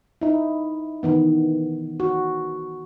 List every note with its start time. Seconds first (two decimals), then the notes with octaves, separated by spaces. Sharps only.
0.21 D#4 E4
1.03 D#3 E3 B3
2.00 F#4